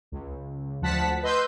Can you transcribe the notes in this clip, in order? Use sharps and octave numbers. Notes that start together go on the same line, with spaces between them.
C#2
D2 F3 F#5 A5 B6
B4 D#5 C6 E6 G6